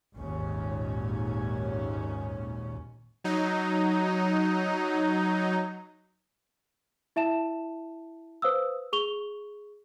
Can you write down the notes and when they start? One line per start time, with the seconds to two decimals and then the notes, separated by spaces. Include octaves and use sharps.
0.16 G#1 D#2 A#2 D#3 C#4
3.24 F#3 D#4
7.16 E4 E5 A5 E7
8.42 B4 C5 F5 D#6 E6
8.93 G#4 C#6 F7 G7